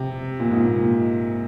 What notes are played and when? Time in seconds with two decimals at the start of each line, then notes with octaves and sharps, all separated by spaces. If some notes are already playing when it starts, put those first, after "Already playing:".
Already playing: C3
0.40 A#2
0.50 G#2
0.65 A#2